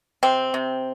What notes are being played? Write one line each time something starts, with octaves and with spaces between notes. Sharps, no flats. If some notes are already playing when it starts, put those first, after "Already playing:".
C3 C4
C3